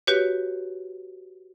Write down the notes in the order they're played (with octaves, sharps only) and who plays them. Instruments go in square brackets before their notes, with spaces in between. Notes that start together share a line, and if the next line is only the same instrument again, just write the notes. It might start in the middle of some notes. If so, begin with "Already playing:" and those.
[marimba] F#4 G4 B4 C#5